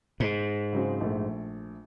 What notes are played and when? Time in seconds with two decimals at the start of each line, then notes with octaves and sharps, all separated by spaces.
0.20 G#2
0.73 C#3 F#3 C4
1.01 A#1 A3